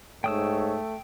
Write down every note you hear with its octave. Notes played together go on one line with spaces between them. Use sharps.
G#2 A3 C#5 G5 D#6 E6